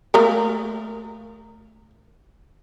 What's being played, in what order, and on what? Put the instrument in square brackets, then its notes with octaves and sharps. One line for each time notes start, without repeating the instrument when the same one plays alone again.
[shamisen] A3 A#3 A#4